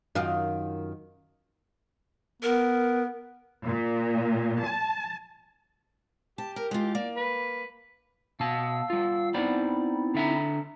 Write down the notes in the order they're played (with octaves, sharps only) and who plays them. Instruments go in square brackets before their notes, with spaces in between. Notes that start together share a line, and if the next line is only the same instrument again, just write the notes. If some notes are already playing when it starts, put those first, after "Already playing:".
[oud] F#2 D#3 F4
[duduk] B3 [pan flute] A#4
[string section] A#2
A5
[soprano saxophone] G4 [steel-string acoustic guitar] A5
[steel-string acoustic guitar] A#4
G#3 F4
[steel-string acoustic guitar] A#3 [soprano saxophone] D5
[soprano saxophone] B4
[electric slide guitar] B2 A5 [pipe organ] F5 E6
[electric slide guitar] G3 F4
[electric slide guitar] B3 C5 D5 [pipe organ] C4 D#4 E4
[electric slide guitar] D3 E5 A#5